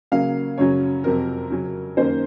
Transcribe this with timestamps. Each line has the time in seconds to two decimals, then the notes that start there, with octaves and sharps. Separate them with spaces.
0.12 C#3 F#3 A#3 C#4 F5
0.58 F#2 C#3 F#3 C#4 C#5
1.04 F2 C3 F#3 C4 A#4
1.50 C#3 F#3 C#4
1.97 F#2 D#3 A#3 C#4 C5